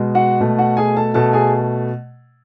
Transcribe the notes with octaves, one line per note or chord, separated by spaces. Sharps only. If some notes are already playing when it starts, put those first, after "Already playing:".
Already playing: B2 G#3
F#4 F#5
B2 A3
F#4 F#5
G#4 G#5
A4 A5
B2 A3 A4 A5
G#4 G#5